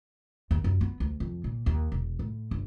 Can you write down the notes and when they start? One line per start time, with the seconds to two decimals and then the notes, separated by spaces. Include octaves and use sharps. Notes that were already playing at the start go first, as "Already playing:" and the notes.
0.51 D#2
0.64 F#2
0.81 B3
1.00 D2
1.20 F2
1.44 A#2
1.66 D#2
1.92 E1
2.19 A2
2.51 G1